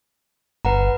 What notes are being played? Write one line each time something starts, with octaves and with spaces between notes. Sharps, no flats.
G1 B4 F#5 A#5